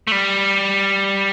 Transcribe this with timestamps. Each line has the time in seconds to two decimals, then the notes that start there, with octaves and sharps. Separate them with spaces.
0.07 A3
0.12 G3